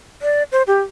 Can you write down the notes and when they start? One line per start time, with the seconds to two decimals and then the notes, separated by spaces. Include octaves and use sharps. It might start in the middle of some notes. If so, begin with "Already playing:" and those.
0.22 D5
0.52 C5
0.67 G4